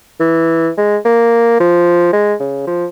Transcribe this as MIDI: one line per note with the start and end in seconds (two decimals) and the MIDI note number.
0.20 0.70 52
0.78 0.97 56
1.05 1.58 58
1.60 2.13 53
2.13 2.35 56
2.40 2.63 49
2.67 2.86 53